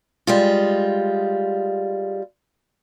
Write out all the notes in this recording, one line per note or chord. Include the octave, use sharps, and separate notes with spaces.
G3 G#3 F4